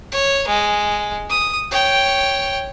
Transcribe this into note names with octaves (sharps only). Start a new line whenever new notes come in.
C#5
G#3
D#6
C#5 G5